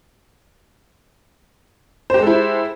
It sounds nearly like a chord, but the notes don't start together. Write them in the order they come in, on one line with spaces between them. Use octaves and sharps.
C5 G4 G#3 A4 E4